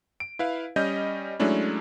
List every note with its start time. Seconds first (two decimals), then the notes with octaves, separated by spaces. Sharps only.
0.20 D7
0.39 E4 B4 F5
0.76 G3 C#4 D#5 G6
1.39 F#3 G#3 A3 C#4 D4 E4